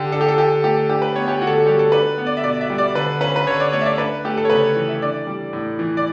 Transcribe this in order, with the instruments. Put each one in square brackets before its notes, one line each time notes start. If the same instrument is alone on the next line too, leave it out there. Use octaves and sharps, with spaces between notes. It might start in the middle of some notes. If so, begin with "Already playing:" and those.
Already playing: [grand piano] D3 G4
D4 A4
G4
A4
D3 G4
A3 G4
D4 G4
B4
B3 C#5
G4
D3 F#4
A4
G4
G3 G4
A4
D4 B4
B3
D5
E5
B2 D5
E5
G3
D5
D3 B4
C#4 B4
B4
D3 C#5
D5
A3 C#5
E5
D5
D4 B4
A3 G4
A4
C#5
C#3 B4
C#5
E3
E5
D4 D5
G3
A2
E3
D5